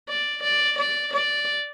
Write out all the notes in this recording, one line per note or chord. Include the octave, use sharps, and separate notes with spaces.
D5
D5
D5
D5